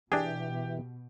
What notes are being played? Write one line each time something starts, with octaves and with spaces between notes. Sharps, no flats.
B2 E3 D4 G4 G#4